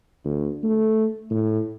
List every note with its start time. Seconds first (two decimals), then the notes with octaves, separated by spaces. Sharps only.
0.25 D2
0.63 A3
1.30 A2